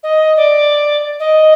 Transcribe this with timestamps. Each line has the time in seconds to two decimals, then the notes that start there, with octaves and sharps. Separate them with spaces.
0.03 D#5
0.37 D5
1.20 D#5